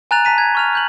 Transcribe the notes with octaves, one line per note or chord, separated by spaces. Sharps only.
G#5 A#5 F#6 A6 F7
A5 A#5 B6 D#7
G#6
C#6 F6 F7
F6 G6 F#7